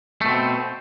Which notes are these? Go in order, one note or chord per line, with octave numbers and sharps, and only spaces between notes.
B2 A3 C4